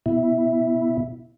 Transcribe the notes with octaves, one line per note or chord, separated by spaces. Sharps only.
B2 E4